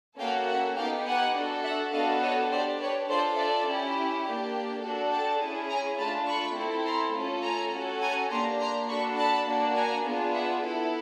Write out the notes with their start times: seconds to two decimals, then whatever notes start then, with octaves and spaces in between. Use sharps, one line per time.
0.20 A#3 C#4 F#4 A4 F5 G5
0.48 E5 F#5
0.77 B3 D#4 G4 F5 G5
1.07 F#5 G#5
1.35 D4 F#4 A4
1.64 E5 F#5
1.93 B3 D4 F#4 A4 D#5 F5
2.22 C#5 D#5
2.51 D4 G4 C5 D5
2.80 B4 C#5
3.09 D4 F4 A4 C5 D5
3.38 D5 E5
3.68 C#4 E4 G4
4.25 A#3 D4 G4
4.83 D4 F#4 A4
5.12 G5 A5
5.41 C#4 E4 G#4
5.71 G#5 A#5
5.99 A3 D4 F4 A5 B5
6.28 B5 C#6
6.57 C4 E4 A4
6.86 A#5 C6
7.15 A3 C#4 F4 A4
7.44 G#5 A#5
7.73 C#4 F#4 A4
8.02 G#5 A#5
8.31 A#3 D4 G4 A#5 C6
8.60 A#5 C6
8.89 D4 F#4 A4 B5 C#6
9.18 A5 B5
9.47 A#3 D4 F#4
9.76 G#5 A#5
10.05 B3 D4 F4 G#4
10.34 E5 F#5
10.63 B3 E4 A4